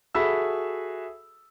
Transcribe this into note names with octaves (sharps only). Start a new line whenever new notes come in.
F#4 G#4 A4 E5 B5 E6